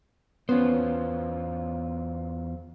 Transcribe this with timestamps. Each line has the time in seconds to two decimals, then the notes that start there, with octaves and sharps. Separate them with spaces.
0.49 E2 B3 C#4 F4 C5